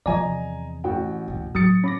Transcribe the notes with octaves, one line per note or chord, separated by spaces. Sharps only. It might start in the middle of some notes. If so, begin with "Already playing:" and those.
E2 C3 F3 D5 D#5 G#5 A#5
A1 F#4 G5
D2 B2
A2 F#3 D#6 A6 C#7
C#4 B5 D6 A#6